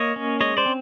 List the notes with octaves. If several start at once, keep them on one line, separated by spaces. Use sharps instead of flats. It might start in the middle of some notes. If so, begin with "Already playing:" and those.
Already playing: A#3 C#5 D#5
C#4
G#3 C#5 D#5
C5 D5
C4